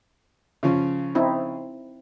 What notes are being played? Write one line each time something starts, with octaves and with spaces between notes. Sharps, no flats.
C#3 F3 C#4
C4 D#4 E4